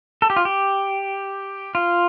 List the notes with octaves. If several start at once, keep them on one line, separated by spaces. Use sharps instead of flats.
A4
G4
F4
G4
F4